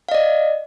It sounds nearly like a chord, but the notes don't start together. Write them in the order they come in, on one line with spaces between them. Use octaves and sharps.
F5 D#5 D5